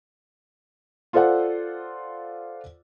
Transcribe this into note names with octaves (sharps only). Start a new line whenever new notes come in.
F4 A4 C5 D5 F#5